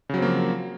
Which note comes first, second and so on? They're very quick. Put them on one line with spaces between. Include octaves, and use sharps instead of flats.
C#3 F#3 C4 A#3 F3